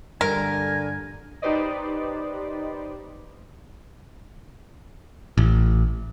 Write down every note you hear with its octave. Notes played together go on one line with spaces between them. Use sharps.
G2 D3 G3 A#4 G#5
D#4 G4 B4 C5 D5 D#5
A1